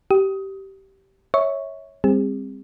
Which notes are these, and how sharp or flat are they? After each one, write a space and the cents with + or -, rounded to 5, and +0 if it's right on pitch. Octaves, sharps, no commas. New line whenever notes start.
G4 -20 D#6 +20
C#5 -5 E5 -25 C#6 +0
G3 +35 C4 +5 G#4 -45